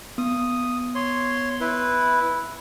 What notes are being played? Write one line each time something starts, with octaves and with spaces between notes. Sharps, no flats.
B3 D#6
C#5 C6
E4 B4